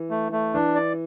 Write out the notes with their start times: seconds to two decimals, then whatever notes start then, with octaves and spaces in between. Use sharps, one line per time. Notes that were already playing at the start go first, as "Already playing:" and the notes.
Already playing: E3
0.10 A3
0.32 A3
0.54 E3 D4
0.75 D5